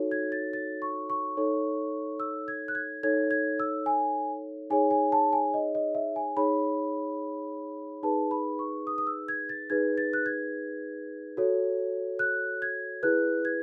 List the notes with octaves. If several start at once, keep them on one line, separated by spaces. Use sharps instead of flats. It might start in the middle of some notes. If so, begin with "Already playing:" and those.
Already playing: D#4 F#4 A4 C#5
G#6
A6
A6
C#6
C#6
D#4 A4 C#5
E6
G#6
F#6
G#6
D#4 A4 C#5 G#6
G#6
E6
G#5
D#4 G#4 C#5 G#5
G#5
A5
G#5
D#5
D#5
E5
G#5
D#4 G#4 C#5 B5
D#4 G#4 B4 A5
B5
C#6
D#6
D#6
E6
G#6
A6
D#4 G#4 B4 G#6
A6
F#6
G#6
F#4 A4 C#5
F#6
G#6
E4 G#4 B4 F#6
G#6